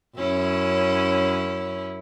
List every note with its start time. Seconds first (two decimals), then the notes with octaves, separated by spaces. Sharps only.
0.17 F#2 C#4 E4